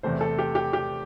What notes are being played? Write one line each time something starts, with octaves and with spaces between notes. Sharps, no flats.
E2 C3 A3 C5
A4
G4
G4
G4